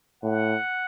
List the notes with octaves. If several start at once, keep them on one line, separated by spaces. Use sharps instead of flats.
A2 F#5